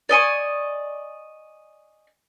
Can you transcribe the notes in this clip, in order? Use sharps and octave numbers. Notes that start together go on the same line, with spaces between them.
D5 D#5 G#5 C#6